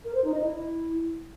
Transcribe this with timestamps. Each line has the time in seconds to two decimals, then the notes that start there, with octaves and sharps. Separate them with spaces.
0.04 A#4
0.14 C5
0.24 D#4
0.34 D#5
0.44 E4